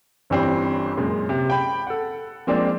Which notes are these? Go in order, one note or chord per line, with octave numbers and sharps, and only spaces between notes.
G1 E3 G3 C4 C#4 C7
F#2 A#2 G#3
C3
G5 B5
A4 F#5
F3 G#3 A#3 C4 D4